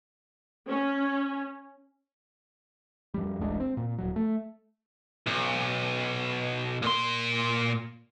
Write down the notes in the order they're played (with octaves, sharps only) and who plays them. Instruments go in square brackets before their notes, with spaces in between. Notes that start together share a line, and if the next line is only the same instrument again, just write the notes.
[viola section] C#4
[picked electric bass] F2 G3
D1 A1 G#3 D4
C4
A#2
D1 F#3
A3
[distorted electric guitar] B1
A#2 C6